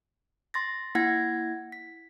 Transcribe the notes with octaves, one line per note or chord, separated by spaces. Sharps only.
C6 A6 A#6
A#3 E4 F#5 G#6 A#6
B6